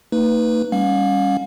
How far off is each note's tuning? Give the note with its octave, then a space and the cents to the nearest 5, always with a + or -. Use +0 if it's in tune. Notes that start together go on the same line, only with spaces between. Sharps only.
A#3 -40 D#4 +0 B4 +0
G3 +15 C#4 +0 F5 +40